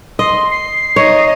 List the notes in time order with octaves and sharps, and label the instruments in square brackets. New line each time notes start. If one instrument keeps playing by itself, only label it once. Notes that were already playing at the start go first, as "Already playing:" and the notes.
[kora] D#5 [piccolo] C6
[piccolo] C7
[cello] D#4 D#5 [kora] C#5